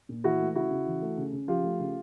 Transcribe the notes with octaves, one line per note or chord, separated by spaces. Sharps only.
A#2
E3 E4 F#4
A3
C#3 E4 F#4
C#3
E3
A3
C#3
C#3
F3 F4 G4
A3
C#3